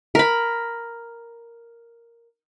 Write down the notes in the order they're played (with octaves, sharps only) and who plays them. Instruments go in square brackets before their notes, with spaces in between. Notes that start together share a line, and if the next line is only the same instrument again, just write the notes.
[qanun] A#4 B5